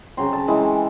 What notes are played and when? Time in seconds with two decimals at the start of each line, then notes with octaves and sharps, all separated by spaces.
0.17 C#3 F#3 C4 C6
0.33 A5
0.48 E3 G#3 C4 E4